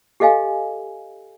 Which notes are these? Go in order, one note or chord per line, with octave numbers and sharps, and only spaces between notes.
G4 A4 D#5 F5 G#5